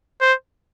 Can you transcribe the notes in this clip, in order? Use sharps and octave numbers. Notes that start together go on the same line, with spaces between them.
C5